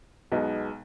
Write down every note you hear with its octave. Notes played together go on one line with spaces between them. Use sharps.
B1 B2 G#3 B3 D#4